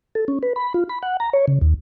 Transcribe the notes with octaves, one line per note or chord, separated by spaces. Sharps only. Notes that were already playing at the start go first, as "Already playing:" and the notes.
A4
C#4
B4
B5
F4
B5
F#5
A#5
C#5
C#3
D#2